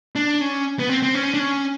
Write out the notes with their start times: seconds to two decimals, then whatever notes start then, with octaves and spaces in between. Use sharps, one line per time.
0.16 D4
0.41 C#4
0.79 B3
0.89 C4
1.02 C4
1.15 C#4
1.34 D4
1.39 C#4